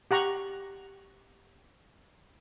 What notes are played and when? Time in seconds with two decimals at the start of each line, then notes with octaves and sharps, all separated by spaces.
0.11 G4 F#5 A#5 C#6